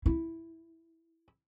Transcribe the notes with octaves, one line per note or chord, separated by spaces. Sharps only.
E4